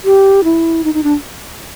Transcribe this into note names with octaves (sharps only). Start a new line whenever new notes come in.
G4
E4
D#4
D#4
D4